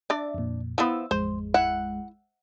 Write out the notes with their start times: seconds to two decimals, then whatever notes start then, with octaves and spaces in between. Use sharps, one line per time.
0.10 D4 D5 E5
0.34 F2 A#2
0.78 F3 B3 E4 E6
1.11 A1 F2 G#3 C5
1.54 E4 F#5